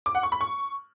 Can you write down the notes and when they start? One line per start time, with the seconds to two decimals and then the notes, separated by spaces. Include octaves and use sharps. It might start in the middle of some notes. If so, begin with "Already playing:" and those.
0.06 D6
0.15 F#5
0.23 C#6
0.32 B5
0.41 C#6